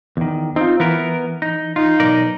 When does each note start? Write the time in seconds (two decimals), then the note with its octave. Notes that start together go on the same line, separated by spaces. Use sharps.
0.17 E2 D#3
0.56 C4 D#4 F4
0.80 E3 B3 E4 A#4
1.42 D#4
1.76 D#4 F4
2.00 B1 A#4 D5